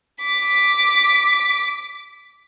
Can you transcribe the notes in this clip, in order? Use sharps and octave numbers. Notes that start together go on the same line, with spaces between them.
D6 B6